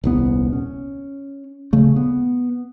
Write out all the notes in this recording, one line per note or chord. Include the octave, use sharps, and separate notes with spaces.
D#1 C2 B3
C#4
D#1 C#3 A3
B3